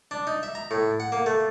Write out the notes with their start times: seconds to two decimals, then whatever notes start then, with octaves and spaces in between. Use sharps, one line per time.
0.11 D4
0.27 D#4
0.43 E5
0.55 A#5
0.71 A2
1.00 F#5
1.12 A#3
1.26 A3